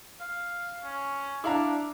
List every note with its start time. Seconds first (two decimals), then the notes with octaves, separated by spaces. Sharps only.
0.20 F5
0.84 C#4
1.44 D4 E4 D5 F5 A#5